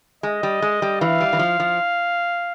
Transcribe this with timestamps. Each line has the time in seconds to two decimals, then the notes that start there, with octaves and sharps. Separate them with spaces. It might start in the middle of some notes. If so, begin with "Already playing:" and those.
0.23 G#3 D#5
0.43 G3
0.62 G#3
0.82 G3
1.01 E3 F5
1.21 G3
1.33 E3
1.39 F3
1.60 F3